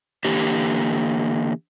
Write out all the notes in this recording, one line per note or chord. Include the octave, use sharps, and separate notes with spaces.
D3 E3 A#3 G4